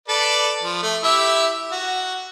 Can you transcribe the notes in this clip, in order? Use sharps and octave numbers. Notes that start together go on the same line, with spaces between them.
A4 B4 D5
F3
A3
E4 G4 E5
F#4